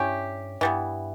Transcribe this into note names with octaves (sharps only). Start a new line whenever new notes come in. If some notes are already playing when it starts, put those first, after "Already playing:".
Already playing: G2 G3 C#4 E4 G4
G2 E3 G3 B3